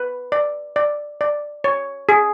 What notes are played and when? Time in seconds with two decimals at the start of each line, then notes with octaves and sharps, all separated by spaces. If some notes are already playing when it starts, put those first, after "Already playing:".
Already playing: B4
0.32 D5
0.76 D5
1.21 D5
1.64 C#5
2.09 G#4